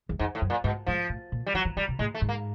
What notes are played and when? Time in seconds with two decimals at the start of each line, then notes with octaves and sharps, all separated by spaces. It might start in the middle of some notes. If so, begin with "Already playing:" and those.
0.09 E2
0.19 F2 G#2
0.35 A2
0.42 F#2
0.50 A#2
0.64 G#2 B2
0.87 G#2 F3
1.09 A2
1.32 A#2
1.46 G3
1.54 E3 F#3
1.65 E3
1.77 D#3 G3
1.88 B2
1.99 A2 G#3
2.15 A3
2.21 G#2
2.29 A#3